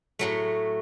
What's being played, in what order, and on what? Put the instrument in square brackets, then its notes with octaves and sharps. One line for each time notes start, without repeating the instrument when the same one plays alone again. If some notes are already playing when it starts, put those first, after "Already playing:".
[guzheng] A2 F#3 A3